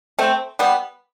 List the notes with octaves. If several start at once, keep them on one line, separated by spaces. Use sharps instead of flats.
A3 C4
G3 B3